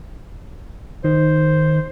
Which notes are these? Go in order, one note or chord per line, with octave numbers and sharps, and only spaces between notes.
D#3 C5